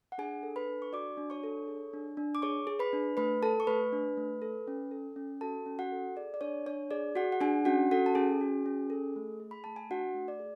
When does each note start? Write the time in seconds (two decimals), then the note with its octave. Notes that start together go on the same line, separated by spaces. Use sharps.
0.12 F#5
0.18 D4 G#4 G#5
0.43 A4
0.56 B4 B5
0.68 D4
0.82 C#6
0.93 F#4 D5 D6
1.17 D4
1.30 C#5 C#6
1.43 A4
1.67 G#4
1.93 D4
2.17 D4
2.35 D6
2.42 G#4 C#5 C#6
2.67 G#4
2.79 B4 B5
2.93 D4
3.17 A3 B4 B5
3.43 A4 A5
3.60 C#6
3.67 A3 B4 B5
3.93 D4
4.17 A3
4.42 A4
4.67 C#4
4.91 A4
5.16 C#4
5.41 F#4 A4 A5
5.66 C#4
5.79 F#4 F#5
5.92 A4
6.16 G#4 D5
6.34 D5
6.41 D4 C#5
6.66 D4 C#5
6.91 G#4 D5
7.15 F#4 G#4 F#5
7.32 F#5
7.41 D4 G#4 G#5
7.65 C#4 F#4 F#5
7.91 F#4 A4 F#5
8.06 A5
8.15 C#4 G#4 G#5
8.41 F#4
8.66 C#4
8.90 A4
9.16 A3
9.40 G#4
9.51 B5
9.64 A3 A5
9.76 G#5
9.90 D4 F#4 F#5
10.15 A3
10.28 D5
10.40 G#4